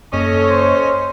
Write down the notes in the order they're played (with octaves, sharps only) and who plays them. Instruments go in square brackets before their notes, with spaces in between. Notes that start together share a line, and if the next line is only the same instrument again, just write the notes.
[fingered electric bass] F#1 F#2 A#3 [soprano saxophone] C#4 [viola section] A4 C#5 D#5
[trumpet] C5